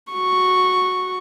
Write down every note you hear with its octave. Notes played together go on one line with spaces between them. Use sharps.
F#4 C#6